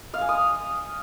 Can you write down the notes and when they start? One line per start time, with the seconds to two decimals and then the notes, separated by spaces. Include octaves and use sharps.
0.14 F5
0.21 G#5
0.29 D#6